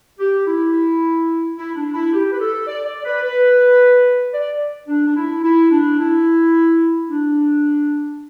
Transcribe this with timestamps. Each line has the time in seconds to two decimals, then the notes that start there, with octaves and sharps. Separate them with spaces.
0.19 G4
0.47 E4
1.57 E4
1.76 D4
1.94 E4
2.13 G4
2.33 B4
2.40 A4
2.67 D5
2.85 D5
3.05 B4
3.23 B4
4.33 D5
4.88 D4
5.07 D4
5.16 E4
5.43 E4
5.71 D4
5.99 E4
7.09 D4